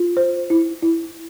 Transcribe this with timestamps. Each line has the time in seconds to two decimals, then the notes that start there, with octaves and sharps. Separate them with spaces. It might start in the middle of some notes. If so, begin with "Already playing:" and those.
Already playing: F4
0.17 C5
0.50 E4
0.82 E4